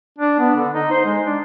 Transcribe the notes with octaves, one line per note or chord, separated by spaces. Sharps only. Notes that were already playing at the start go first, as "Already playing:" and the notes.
D4
B3
D3
D#4
C5
G#3
D4